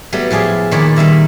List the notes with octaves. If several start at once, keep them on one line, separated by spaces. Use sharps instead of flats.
F#3 G3 A3 B3
A2 F3 G#4 D5 A5
A#2 D#3 C#5 D5 A5 B5
D#3 G3 E5 A#5